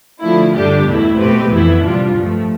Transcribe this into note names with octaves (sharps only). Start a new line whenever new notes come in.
D3 F3 A3 E4
G2 D3 G3 D4 G4
E2 B2 A3 E4
B2 A3 C4 G4 B4
F2 E3 B3 E4
C3 G3 D4 F4
G2 F3 A3